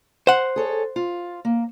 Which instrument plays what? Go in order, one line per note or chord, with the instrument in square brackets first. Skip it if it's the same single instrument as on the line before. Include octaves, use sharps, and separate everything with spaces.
[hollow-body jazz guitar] C5 F#5
[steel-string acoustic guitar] G#4 A4 C#5
F4
A#3